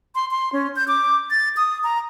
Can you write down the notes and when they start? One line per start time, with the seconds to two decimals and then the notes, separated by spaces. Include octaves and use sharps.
0.15 C6
0.31 C6
0.53 C#4
0.76 G6
0.88 D6
1.30 A6
1.57 D#6
1.84 A#5